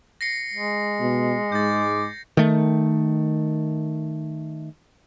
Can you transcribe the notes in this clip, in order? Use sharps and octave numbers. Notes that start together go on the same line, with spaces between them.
A#6 C7 C#7
G#3
B2
G#2 D6 G6 A6
D#3 A3